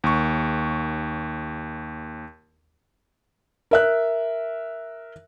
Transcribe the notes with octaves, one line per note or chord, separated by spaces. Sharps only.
D#2 C#6
A#4 E5 F#6